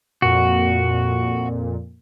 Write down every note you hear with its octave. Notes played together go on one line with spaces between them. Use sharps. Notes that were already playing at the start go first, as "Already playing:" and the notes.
F2 A#2 F#4